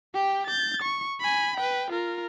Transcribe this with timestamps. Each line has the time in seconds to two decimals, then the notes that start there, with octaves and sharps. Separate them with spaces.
0.14 G4 G5
0.47 G6 A6
0.82 C#6
1.20 G#5 B5
1.57 B4 G5
1.91 F4 A#4